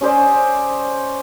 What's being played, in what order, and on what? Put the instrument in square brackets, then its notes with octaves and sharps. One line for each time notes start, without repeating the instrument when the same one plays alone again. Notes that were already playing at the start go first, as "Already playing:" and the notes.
[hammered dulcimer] C#4 G#4 C5 D5